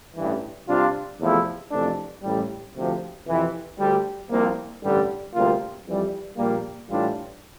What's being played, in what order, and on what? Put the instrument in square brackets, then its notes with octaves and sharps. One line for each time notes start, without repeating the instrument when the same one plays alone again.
[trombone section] A1 G2 E3
C3 G3 D4 F4
E2 C3 F3 A3 E4
F2 C3 E3 A3 D4
A1 A2 G3
D2 C3 F3
F2 C3 E3
D2 D3 G3
C2 C3 F3 A#3
A1 G2 D3 G3
D2 C3 G3 A#3 F4
F2 E3 G3
A#1 A#2 G3 A#3
A2 E3 G3 D4 F4